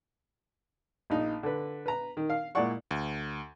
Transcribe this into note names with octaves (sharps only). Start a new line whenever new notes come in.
A#1 D#4
D3 B4
B4 A#5
D#3
F5
A#2 G#3 E4 D5 F#5 C#6
D2